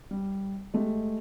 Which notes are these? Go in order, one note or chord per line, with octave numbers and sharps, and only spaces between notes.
G3
G#3 A3 G4